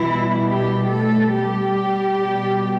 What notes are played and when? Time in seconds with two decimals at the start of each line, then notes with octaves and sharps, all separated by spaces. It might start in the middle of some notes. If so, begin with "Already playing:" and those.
Already playing: B2 E3 G3 E4
0.47 G3 G4
0.89 A3 A4
1.32 G3 G4
2.18 B2 A3